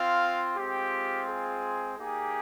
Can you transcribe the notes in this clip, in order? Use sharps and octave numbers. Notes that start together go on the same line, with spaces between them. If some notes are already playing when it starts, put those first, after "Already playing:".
Already playing: C4 F4 F5
G#3 C4 F4 G4
G#4
A#3 D#4 G4 G#4